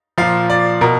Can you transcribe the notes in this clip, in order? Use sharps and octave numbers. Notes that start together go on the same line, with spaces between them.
A#2 F3 F5
D5
B2 A#4